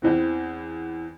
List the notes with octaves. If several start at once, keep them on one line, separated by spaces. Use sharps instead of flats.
E2 E3 C4